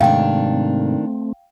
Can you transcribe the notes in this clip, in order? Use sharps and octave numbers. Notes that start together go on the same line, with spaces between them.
G#2 C3 D#3 A3 C4 D4 F5 G5